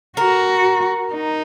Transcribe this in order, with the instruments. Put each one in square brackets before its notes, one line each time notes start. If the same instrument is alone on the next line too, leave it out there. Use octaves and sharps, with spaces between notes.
[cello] F#4 [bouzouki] A#4
[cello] D#4